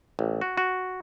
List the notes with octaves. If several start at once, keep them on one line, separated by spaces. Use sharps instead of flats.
A1
F#4
F#4